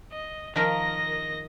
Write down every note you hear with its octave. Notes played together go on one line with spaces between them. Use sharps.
D#5
D#3 F3 A#4 D#5 A#6